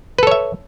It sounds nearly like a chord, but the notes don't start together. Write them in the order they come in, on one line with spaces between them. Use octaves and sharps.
B4 A4 C#5 E5